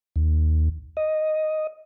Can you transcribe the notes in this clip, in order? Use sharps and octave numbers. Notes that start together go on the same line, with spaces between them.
D#2
D#5